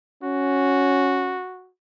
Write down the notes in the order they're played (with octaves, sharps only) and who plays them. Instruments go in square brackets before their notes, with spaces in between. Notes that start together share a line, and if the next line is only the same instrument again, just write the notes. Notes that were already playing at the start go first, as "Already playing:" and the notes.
[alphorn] C#4 [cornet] F#4